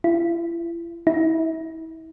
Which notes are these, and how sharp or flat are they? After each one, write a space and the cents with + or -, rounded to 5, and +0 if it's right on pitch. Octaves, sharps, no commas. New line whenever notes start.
E4 +40
E4 -35